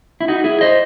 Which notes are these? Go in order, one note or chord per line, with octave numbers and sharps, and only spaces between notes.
E4
D#4 F#4
E4 G#4
C5 D#5